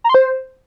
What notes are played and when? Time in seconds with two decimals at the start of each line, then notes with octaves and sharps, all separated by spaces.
0.04 A#5
0.09 C6
0.15 C5